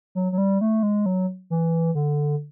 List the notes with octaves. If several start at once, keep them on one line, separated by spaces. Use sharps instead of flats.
F#3
F#3
G3
A3
G#3
F#3
E3
D3